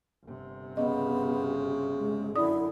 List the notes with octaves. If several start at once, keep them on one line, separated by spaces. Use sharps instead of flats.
G1 C3
C#3 B3 D#5
G#3
F#2 D3 E4 D5 D#6